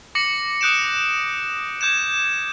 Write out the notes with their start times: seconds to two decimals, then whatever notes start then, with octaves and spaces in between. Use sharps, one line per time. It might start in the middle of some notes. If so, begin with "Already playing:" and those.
0.15 D6 A#6 C#7 F#7
0.61 D#6 F#6 G6 D7 E7
1.81 D6 G6 G#6 E7